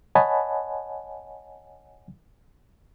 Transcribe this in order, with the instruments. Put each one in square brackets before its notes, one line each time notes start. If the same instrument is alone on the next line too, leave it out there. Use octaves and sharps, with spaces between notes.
[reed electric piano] C#5 D#5 F#5 G#5 A5 B5